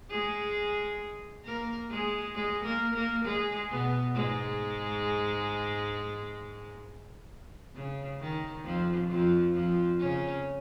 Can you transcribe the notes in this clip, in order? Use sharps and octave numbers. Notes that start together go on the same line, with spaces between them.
G#3 G#4
A#3 A#4
G#3 G#4
G#3 G#4
A#3 A#4
A#3 A#4
G#3 G#4
B2 B3
G#2 G#3
C#3
D#3
F2 F3
F2 F3
F2 F3
C#3 C#4